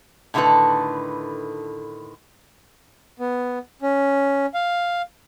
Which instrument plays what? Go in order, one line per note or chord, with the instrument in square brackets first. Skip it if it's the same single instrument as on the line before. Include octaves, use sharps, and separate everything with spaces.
[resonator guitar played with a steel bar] A2 D3 D#3 B3 A4 B4
[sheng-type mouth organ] B3
C#4
F5